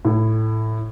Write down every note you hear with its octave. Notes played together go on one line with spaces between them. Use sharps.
A2